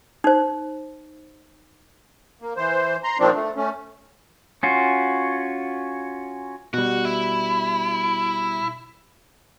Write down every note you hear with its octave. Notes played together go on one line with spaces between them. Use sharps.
D#4 C5
A#3
E3 C5
A#5 C6
A#2 D#3 F3 C4 D4
A3
A3 C#4
C#4 F4 F#4
B2 G3 F#4
E4